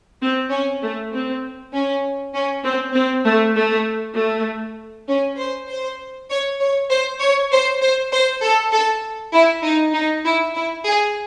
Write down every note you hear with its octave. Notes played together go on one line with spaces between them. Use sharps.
C4
C#4
A3
C4
C#4
C#4
C4
C4
A3
A3
A3
C#4
C5
C5
C#5
C#5
C5
C#5
C5
C5
C5
A4
A4
E4
D#4
D#4
E4
E4
G#4